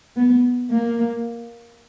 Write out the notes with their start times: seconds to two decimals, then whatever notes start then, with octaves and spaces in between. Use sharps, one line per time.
0.17 B3
0.71 A#3